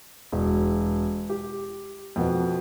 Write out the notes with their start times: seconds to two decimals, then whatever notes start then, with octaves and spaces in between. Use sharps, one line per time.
0.32 E1
1.30 G4
2.16 F2 B2 B3